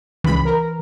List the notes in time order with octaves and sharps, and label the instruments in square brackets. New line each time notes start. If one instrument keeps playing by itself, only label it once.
[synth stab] C#2 B5 [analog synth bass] E3
[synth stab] A#4